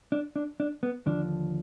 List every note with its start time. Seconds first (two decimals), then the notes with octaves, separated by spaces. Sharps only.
0.12 D4
0.36 D4
0.60 D4
0.83 B3
1.06 D#2 D3 F3 D4